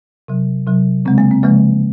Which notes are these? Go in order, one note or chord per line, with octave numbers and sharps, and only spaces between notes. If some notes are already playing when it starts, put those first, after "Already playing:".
C3 F#3
C3 F#3
C#3 G#3 C4
A#3
C4
C#3 F3 G#3 A#3